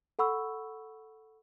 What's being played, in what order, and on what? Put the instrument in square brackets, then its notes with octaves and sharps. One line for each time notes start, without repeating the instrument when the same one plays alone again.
[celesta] A4 F#5 B5 C#6 E6